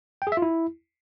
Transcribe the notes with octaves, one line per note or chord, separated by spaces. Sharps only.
G5
G#4
E5
F4
E4